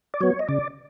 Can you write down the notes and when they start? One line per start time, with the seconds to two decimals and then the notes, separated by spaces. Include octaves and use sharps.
0.14 D5
0.21 F#3 B3 C#5
0.39 D#5
0.48 C#3 D5